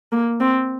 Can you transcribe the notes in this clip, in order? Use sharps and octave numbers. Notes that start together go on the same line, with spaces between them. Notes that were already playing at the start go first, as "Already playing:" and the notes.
A#3
C4